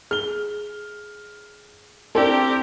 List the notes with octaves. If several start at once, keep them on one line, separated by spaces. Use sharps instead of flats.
G#4 F6 G7
C4 D4 E4 G4 A4 A#4